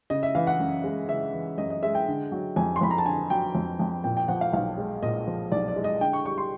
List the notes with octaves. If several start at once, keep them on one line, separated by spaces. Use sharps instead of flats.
C#3 D#5
E5
E3 F5
F#5
F#2
G#3
C#3 E5
E3
F#2 D#5
D#5
G#3 E5
G5
D3
F#3
F2 G#5
C6
F2 B5
A#5
A5
D3 G#5
F#3 G5
F2
F2
A#2 G5
G5
F3 F#5
F5
B1 F5
G#3
A#2 D#5
F3
B1 D5
D5
G#3
D#5
D3 G5
C#6
G3 C#6
C6